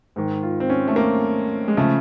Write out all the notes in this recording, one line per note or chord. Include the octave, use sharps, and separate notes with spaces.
G#2 D#3
F4
C4
C#4
A3
A#3
G#3
C#3 F3 A3